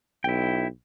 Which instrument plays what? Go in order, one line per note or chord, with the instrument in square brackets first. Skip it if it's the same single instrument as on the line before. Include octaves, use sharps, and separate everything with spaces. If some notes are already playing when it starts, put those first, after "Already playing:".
[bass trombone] B1 [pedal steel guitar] E4 G5